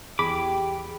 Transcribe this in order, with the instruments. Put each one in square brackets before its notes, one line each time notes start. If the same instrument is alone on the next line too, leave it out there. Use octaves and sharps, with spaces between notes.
[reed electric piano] E2 G#4 B5 [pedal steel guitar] G4 D6